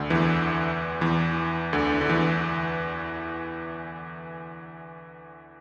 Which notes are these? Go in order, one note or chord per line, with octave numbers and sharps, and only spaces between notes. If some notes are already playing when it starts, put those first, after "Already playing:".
Already playing: D2 D3
E2 E3
E2 E3
D2 D3
D3
E2 E3